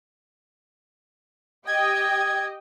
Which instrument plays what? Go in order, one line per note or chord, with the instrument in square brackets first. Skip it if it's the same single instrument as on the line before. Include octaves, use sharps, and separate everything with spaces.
[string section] G4 D#5 G5 [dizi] G#6